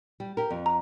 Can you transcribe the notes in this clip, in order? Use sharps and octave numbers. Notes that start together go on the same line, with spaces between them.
G3
G4 A#4
F2
A#5